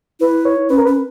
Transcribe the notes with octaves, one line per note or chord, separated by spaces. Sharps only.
E4 B4
C#5
C#4 B4
A#4
C#4 B4